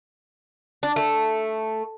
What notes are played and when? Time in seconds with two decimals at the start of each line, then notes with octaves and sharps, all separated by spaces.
0.83 D4
0.96 A3